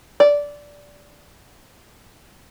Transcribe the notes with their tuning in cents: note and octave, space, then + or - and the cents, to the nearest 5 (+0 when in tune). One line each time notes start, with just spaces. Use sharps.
D5 -10